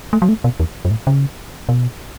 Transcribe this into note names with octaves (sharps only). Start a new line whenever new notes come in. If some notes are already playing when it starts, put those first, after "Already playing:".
A3
F#3
A3
B2
E2
F#2
A2
C#3
B2